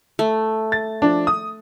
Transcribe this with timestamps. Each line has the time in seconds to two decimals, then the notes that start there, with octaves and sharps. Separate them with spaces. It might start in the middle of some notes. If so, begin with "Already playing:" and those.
0.19 A3
0.72 A6
1.02 F3 D4
1.27 D#6